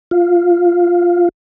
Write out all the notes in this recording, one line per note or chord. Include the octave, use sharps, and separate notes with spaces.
F4